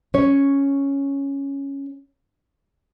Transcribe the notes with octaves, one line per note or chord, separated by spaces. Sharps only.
C#4 C#5